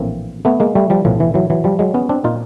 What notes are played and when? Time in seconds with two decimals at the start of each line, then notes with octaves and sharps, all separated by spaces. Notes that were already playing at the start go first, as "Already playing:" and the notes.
Already playing: A#1 A2 E3 A#3 C4
0.45 A3 B3
0.60 G#3 A#3
0.75 G3 A3
0.90 F3 G3
1.05 B1 A2 E3 F3
1.20 E3
1.34 E3 F#3
1.50 E3 F#3
1.64 F3 G3
1.79 F#3 G#3
1.94 B3 C#4
2.09 C4 D4
2.24 A#2 D#4 F4